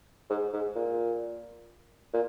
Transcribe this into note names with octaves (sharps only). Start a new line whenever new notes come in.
G#2
G#2
A#2
A#2